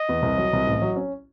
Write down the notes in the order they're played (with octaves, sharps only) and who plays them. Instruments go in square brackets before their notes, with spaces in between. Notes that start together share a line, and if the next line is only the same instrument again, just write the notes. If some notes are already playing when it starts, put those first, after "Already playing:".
Already playing: [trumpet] D#5
[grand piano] E2
C2
F#3
C2
A1
F#3
C#4